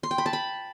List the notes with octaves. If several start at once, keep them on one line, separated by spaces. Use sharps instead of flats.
C6
G5
B5
A5
B5